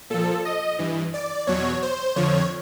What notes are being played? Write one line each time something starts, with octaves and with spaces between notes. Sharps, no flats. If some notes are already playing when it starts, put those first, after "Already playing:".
A#2 F3 A4
D#5
G2 E3
D5
E2 B2 F#3 C#5
C5
F2 D3 F3 C#5